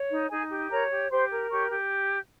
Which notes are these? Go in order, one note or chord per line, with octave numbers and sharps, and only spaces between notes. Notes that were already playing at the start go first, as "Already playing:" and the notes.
Already playing: C#5
D#4
D#4 G#4 G#5
G4
A#4 C#5 A#5
G4
G4 C5 C6
A#4
G4 C#5 C#6
G4